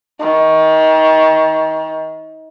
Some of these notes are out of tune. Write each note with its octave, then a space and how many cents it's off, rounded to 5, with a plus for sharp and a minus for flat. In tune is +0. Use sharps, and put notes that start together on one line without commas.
D#3 +30